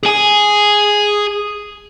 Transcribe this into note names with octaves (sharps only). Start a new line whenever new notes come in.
G#4 G#5